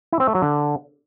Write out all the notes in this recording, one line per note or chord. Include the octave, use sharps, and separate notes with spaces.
E4
C4
A3
F#3
D3